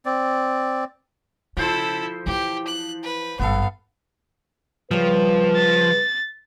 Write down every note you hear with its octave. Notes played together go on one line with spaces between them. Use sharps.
C4 D5
C#3 F3 E4 A4 C5 C6
E3 E4 G4
F#6
B4
G#1 G2 B3 A4 F5
C#3 F3 G3 B4
A6